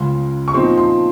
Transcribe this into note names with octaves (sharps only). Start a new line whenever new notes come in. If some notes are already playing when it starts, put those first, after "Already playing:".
Already playing: C#2 C#3 G#3 C6
C#6
A#2 F3 C4 D#4 C6
C6